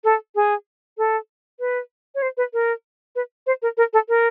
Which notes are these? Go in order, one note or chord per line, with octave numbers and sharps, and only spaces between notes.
A4
G#4
A4
B4
C#5
C5
B4
A#4
B4
C5
A#4
A#4
A4
A#4